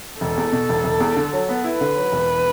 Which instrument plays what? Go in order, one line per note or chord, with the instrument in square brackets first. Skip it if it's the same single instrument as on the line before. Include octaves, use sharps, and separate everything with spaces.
[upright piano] E1 [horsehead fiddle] A4
[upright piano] E2
B2
E1
E1
E2
D3
F#3
B3
[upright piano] E4 [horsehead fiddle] B4
[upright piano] D3
F#3
E1